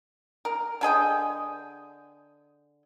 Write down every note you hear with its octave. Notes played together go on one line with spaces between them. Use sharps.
A#4
D3 G#4 D#5 G5